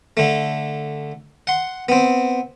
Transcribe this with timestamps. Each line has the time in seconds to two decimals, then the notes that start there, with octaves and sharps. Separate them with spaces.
0.17 D3 A3
1.47 F#5 C6
1.89 B3 C4